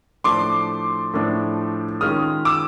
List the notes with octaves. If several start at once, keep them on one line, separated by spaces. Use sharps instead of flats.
A2 F3 A3 D4 C6 D6
A2 F3 A3 D4
D#3 G#3 C#4 F4 D#6 F6
D6 E6